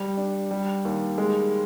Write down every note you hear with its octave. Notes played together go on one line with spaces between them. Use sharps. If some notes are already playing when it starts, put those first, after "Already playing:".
Already playing: G3
D4
G3
D#2
G#3